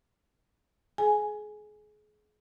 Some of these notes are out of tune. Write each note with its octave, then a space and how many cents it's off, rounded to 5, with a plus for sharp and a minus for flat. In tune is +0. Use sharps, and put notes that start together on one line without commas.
G#4 +30 G#5 +0